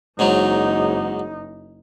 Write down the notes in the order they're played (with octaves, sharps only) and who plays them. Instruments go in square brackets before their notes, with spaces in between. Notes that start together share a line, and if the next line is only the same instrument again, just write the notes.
[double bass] F#1 D#4 [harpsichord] G#2 F#3